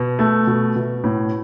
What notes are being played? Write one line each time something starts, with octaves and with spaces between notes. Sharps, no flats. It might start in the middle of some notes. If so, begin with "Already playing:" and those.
Already playing: B2
A3
B2
B2
A2